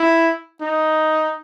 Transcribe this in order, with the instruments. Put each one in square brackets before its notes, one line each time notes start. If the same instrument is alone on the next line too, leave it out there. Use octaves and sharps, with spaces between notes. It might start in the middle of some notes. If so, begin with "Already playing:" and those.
Already playing: [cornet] E4
D#4